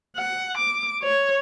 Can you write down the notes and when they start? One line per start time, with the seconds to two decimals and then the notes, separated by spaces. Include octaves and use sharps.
0.17 F#5
0.58 D6
1.03 C#5